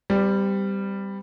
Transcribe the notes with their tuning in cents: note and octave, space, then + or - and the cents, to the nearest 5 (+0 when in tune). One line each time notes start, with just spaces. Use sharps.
G3 +5 C4 -35